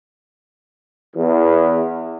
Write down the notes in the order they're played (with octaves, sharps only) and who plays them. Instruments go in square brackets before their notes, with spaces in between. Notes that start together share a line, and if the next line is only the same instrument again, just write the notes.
[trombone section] E2